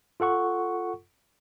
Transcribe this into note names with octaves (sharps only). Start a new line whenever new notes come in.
F4 A4 F#5 C#6